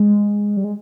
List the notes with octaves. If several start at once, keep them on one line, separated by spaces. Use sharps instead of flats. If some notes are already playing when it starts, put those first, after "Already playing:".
Already playing: G#3
G3
G#3